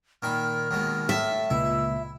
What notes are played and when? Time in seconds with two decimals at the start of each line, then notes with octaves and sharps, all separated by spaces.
0.23 A#2 D#3 B5 F6
0.71 D#2 B2 G#3
1.09 A2 E5 A5
1.50 C#2 A#2 E4 E6